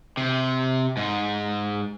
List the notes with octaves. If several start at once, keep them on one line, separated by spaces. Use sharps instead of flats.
C3
G#2